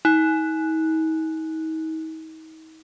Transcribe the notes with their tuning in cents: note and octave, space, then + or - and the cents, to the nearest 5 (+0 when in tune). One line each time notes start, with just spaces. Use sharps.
D#4 +40